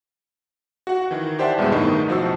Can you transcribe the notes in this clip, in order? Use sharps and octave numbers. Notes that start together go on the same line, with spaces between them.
F#4 F#5
D#3 E3
G4 C5 D5 E5 F#5 A5
E2 G2 B2 G#3 B3
A2 D#3 D#4
B1 F3 F#4 C5 A5 E6